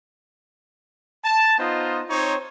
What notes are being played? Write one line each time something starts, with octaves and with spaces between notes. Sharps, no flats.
A5
B3 D#4 F4 C5 D#5
C4 D#4 C5 C#5